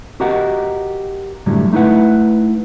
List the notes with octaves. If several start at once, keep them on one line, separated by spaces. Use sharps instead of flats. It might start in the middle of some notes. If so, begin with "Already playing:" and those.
F#4 G4 A#4 D#5 F#5
F#2 A2 D3 F#3 G3
A3 D#4 E4 B4 F#5